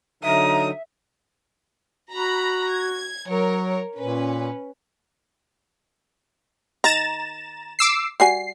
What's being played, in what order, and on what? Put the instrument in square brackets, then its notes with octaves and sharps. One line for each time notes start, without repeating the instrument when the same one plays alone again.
[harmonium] D3 F#3 D#4 [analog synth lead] E5 [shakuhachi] A#5 [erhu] D#6
[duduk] F#4 [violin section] A#5 B5
[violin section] G#6
[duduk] F#3 [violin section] A#4 C#5
[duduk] A#2 [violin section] C#4 B4
[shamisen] D#3 [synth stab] A#5 A6 E7
[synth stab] D6 E6 C7
[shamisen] G3 F#4 G#5 [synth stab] C7